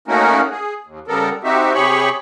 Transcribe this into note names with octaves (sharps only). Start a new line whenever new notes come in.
A3 A#3 C#4 D#4 F#4 A#4
G#4
D#2
C#3 G3 B3 A4 A#4
C4 D#4 F#4 G4 E5
C3 G4 G#4 C#5 B5 C#6